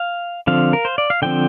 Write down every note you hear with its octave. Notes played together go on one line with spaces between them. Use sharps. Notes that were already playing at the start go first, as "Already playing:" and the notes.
Already playing: F5
D3 F3 C4 F5
A#4
C5
D5
F5
D3 F3 C4 G5